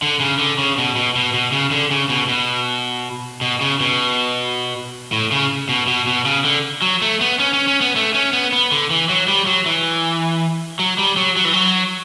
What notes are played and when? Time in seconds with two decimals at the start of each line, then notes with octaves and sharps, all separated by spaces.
0.02 D3
0.20 C#3
0.39 D3
0.58 C#3
0.78 B2
0.96 B2
1.15 B2
1.34 B2
1.52 C#3
1.71 D3
1.91 C#3
2.09 B2
2.28 B2
3.41 B2
3.61 C#3
3.80 B2
5.12 A2
5.32 C#3
5.69 B2
5.88 B2
6.07 B2
6.25 C#3
6.44 D3
6.82 F#3
7.02 A3
7.21 B3
7.39 C#4
7.53 C#4
7.68 C#4
7.81 B3
7.96 A3
8.14 C#4
8.33 B3
8.52 B3
8.72 D3
8.91 E3
9.09 F#3
9.28 G3
9.47 F#3
9.66 E3
10.79 F#3
10.99 G3
11.17 F#3
11.37 F#3
11.45 E3
11.54 F#3